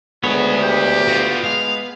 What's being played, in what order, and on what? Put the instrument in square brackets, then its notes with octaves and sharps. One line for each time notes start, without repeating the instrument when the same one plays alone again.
[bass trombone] D2 [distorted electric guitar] G#3 C#5 [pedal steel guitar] B3 [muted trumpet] G#4
[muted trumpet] G4
[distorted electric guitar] F4 F#4
[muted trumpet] G#3 [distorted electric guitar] F5